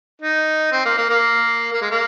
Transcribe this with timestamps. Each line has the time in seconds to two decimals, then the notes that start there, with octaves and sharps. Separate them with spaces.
0.22 D#4
0.72 C4
0.85 A#3
0.98 A#3
1.10 A#3
1.73 A#3
1.82 G#3
1.91 A#3